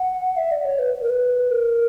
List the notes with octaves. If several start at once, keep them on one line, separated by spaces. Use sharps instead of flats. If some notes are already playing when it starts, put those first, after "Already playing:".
Already playing: F#5
E5
D5
C#5
B4
B4
A#4
B4
A#4